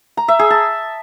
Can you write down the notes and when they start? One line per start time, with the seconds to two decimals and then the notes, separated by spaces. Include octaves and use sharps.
0.17 A#5
0.28 E5
0.39 G#4
0.50 A5